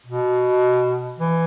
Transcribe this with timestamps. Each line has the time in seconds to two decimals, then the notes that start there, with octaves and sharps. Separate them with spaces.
0.07 B2
1.19 E3